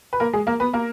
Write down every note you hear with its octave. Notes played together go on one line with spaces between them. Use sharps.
B4
A#3 A#4
G#3 G#4
A#3 A#4
B3 B4
A#3 A#4